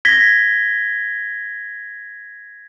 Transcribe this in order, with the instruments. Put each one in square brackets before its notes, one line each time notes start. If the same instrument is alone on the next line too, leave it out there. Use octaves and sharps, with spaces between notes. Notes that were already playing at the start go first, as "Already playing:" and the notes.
[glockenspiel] G#6 A#6 B6 G7